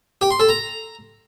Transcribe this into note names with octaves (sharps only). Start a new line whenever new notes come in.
G4
C6
A4
A#5